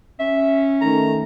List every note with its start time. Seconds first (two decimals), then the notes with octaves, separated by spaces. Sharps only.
0.20 C#4 E5
0.81 D#3 A3 D#4 A#5